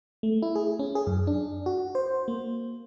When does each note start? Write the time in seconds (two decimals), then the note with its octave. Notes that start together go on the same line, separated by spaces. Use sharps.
0.23 A3
0.43 E4
0.55 G#4
0.79 C#4
0.95 G#4
1.07 F#2
1.27 D4
1.66 F#4
1.95 C5
2.28 A#3